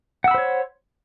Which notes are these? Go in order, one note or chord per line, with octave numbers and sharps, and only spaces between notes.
C5 C#5 F#5 B5 E6